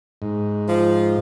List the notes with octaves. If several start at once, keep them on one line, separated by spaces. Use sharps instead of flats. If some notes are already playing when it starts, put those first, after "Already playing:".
G#2
F3